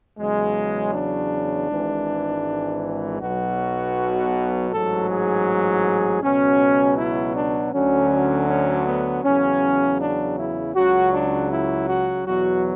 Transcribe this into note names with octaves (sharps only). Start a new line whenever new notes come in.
E2 C#3 F#3 G#3
D4
G#1 G#2 E3
B1 B2 F#3 F#4
A1 G#2 F#3 A4
G#4
C#2 B2 F#3 C#4
E4
D4
D2 D3 F#3 C#4
C#4
B3
E2 C#3 F#3 C#4
D4
E4
C#2 C#3 F#3 F#4
D4
E4
F#4
E2 B2 F#3 F#4